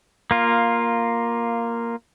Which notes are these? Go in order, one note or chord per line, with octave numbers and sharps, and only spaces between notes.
A#3 F4